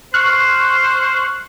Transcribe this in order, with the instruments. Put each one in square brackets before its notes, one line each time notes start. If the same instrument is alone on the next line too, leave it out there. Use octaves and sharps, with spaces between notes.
[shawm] C5 [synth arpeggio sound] C#6 F6 F#6